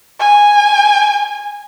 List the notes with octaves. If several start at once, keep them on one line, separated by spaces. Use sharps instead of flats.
G#5